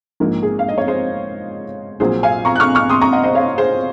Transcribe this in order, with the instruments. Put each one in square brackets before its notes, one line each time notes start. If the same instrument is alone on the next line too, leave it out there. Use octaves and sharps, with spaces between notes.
[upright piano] A#1 G#2 F3 A#3 A#4
G#4
F5
D#5
C#5
G#4 C5
A#1 A#2 F#3 C4 G#4 C5
F5 G#5
A#5 C#6
F#6
C#6 F6
C#6 F6
C6 D#6
A#5 C#6
D#5 F#5
C5 D#5
C#5 F5
G#4 C5